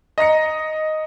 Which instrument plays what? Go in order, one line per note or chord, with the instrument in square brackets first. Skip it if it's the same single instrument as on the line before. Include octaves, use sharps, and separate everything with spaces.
[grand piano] D#5 A#5 A#6 C#7